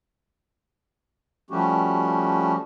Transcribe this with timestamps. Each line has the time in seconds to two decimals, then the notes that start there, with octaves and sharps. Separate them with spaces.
1.50 F3 G3 A3 C#4 F#4 G4